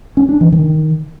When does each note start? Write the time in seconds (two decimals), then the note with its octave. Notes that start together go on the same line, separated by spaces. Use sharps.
0.17 C#4
0.29 D4
0.41 E3
0.52 D#3